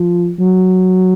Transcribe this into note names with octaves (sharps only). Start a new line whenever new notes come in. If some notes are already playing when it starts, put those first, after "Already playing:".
Already playing: F3
F#3